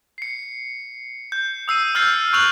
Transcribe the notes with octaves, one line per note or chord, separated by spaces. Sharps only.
C7 C#7
G6
D#6 E6 C7 D#7
E6 F6 G6 A6 C7
C#6 E6 F#6 F7 F#7